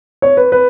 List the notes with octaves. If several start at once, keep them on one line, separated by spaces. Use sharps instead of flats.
C#5
B4
B4